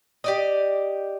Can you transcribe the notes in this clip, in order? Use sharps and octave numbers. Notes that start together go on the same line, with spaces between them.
G4 D5 D#5